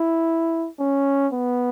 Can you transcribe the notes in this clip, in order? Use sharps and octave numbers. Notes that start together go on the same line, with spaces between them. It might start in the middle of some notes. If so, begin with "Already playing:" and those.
Already playing: E4
C#4
B3